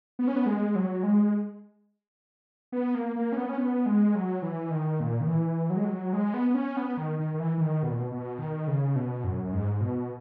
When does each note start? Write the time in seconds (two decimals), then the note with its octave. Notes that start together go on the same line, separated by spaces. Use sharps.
0.19 B3
0.27 C#4
0.36 B3
0.46 G#3
0.75 F#3
1.03 G#3
2.72 B3
2.95 A#3
3.16 A#3
3.32 C#4
3.37 B3
3.49 C#4
3.58 B3
3.86 G#3
4.15 F#3
4.42 E3
4.71 D#3
5.00 A#2
5.21 D#3
5.27 E3
5.70 F#3
5.77 G#3
5.85 F#3
6.13 G#3
6.34 B3
6.50 B3
6.54 C#4
6.77 B3
6.97 D#3
7.19 D#3
7.34 D#3
7.40 E3
7.58 E3
7.61 D#3
7.83 B2
7.90 A#2
7.98 B2
8.11 B2
8.39 D#3
8.68 C#3
8.96 B2
9.24 F#2
9.44 F#2
9.53 G#2
9.81 B2